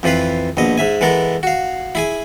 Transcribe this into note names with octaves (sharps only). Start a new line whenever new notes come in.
F2 E3 F4 B4 F5
A#1 B2 D#5
G#2 E5 G#5
E3 G#3 B3 A4 A#4
F#4 F5
E4 G#4 G#5